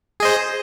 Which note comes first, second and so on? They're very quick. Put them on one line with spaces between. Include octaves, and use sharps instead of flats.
G#4 D#5 C5